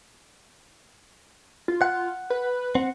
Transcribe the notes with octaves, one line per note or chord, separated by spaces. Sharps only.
F4
F#5
B4
C4 F#5